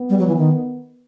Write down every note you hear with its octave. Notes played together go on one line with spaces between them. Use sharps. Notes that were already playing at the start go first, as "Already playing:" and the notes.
Already playing: B3
G3
F#3
E3
D#3